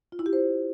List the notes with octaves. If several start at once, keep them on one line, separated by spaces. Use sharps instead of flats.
F4
E4
G4
C5